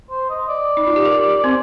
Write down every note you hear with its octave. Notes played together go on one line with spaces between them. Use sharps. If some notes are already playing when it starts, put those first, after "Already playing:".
C5
D#5
D5
D#4
F4
G4
A#4
C4 C5